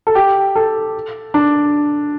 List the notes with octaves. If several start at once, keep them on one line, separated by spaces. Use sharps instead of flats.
A4
G4
A4
D4